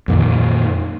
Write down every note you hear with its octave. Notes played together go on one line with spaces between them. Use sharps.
F2 A#2 D#3